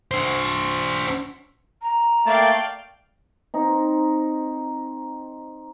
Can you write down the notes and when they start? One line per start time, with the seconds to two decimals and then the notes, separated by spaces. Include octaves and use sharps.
0.11 D4 C5
1.82 A#5
2.26 A3 A#3 D5 F5 G5 A5
3.54 C4 D#4